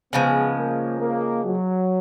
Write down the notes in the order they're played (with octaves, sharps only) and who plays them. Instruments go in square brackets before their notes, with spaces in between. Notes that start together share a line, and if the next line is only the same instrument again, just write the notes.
[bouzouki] C#3 F3 G#3 [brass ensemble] B3
[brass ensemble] A#3
A#3
F#3